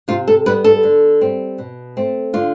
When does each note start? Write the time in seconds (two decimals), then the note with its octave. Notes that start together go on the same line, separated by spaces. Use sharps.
0.08 C3 F4
0.28 A4
0.46 G3 B3 B4
0.64 A4
0.83 D3
1.21 G3 C4
1.58 B2
1.97 A3 C4
2.33 D3 F4